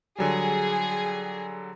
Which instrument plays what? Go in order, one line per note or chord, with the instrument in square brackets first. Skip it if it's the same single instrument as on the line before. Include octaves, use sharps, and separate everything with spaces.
[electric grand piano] D3 F#3 G3 [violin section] G#4